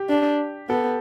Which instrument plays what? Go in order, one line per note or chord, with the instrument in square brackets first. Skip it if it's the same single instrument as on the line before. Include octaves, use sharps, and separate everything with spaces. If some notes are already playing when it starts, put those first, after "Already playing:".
Already playing: [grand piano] G4
[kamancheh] D4
[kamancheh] B3 [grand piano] A4